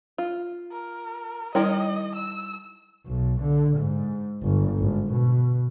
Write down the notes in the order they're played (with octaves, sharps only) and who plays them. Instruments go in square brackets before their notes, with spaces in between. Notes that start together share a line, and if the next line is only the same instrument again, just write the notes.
[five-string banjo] F4
[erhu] A#4
[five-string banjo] D#3 A#4 C#5 [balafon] G3 E4 G5 [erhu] D#5
[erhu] E6
[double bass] B1
D3
G#2
G1
G#1
B2